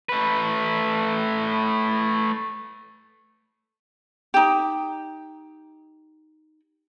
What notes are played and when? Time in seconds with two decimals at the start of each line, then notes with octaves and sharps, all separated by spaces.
0.09 A3 B4
4.34 D#4 G4